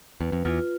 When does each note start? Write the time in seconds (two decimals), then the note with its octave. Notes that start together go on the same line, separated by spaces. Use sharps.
0.20 E2 B4
0.32 F2
0.45 E2 F4